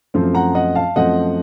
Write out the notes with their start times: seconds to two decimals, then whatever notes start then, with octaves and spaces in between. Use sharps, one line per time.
0.14 F#2 F3 A3 C4
0.35 F#5 A#5
0.55 D#5 F#5
0.75 F5 A5
0.96 F#2 F3 A3 C4 D#5 F#5